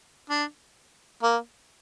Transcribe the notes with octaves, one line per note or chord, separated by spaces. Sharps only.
D4
A#3